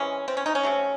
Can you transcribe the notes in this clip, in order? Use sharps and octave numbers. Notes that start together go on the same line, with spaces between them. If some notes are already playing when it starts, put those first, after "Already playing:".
Already playing: C3 E3 G#3 C#4
C4
C#4
D#4
C#4
C3 F#3 A3